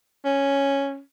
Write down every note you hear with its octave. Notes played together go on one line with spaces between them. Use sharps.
C#4